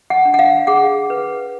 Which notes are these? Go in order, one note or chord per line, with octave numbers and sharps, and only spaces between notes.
F#5
D4
F#5
F5
G#4 F#5
B4